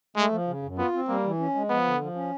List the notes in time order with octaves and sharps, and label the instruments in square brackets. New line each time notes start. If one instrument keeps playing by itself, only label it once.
[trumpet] G#3 [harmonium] A3
[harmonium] F3
C#3
F#2
[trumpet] B3 [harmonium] F4
[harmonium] C4
[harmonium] G3 [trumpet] A#3
[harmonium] E3
C#4
G#3
[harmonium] F3 [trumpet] B3
[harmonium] D3
F3
C#4